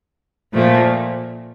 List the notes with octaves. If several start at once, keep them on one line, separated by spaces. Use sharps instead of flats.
A#2 F3 A3